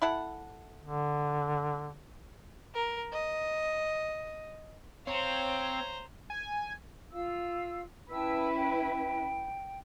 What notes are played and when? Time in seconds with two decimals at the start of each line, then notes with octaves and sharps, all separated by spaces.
0.02 E4 A4 F#5
0.82 D3
2.74 A#4
3.13 D#5
5.07 C4 C5 C#5 F5 A#5
6.30 G#5
7.12 F4 F5 E6
8.10 C#4 E4 B4 G5 A5 E6
8.56 G5